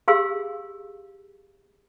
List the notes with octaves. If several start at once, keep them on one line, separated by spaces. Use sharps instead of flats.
G4 G#4 F5 C6 E6